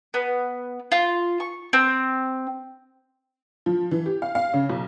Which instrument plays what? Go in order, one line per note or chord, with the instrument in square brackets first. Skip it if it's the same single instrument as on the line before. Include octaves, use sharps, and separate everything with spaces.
[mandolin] B3
F4
C#6
C4
[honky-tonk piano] F3
E3
G4
F5
F5
C#3
B1